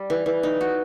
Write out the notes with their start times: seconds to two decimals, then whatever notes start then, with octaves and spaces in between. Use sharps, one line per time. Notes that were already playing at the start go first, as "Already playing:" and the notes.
Already playing: G3
0.10 E3
0.26 E3
0.43 D#4
0.61 F#4